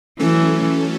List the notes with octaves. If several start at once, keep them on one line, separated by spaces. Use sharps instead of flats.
E3 F#3 A3 C#4 A4